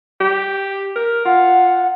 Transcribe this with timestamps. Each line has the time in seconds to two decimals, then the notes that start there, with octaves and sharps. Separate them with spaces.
0.20 G4
0.96 A#4
1.25 F4 F#5